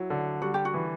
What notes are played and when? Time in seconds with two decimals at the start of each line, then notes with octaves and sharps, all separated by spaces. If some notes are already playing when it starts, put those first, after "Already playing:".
Already playing: F#3 E4
0.10 D3
0.42 G3 F#4
0.54 G4
0.65 F#4
0.74 E3